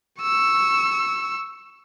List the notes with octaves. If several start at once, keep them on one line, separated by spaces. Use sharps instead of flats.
C#6 E6